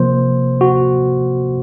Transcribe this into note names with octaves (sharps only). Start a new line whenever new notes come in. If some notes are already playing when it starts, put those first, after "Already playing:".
Already playing: C3 F3 A#3 C5
F#4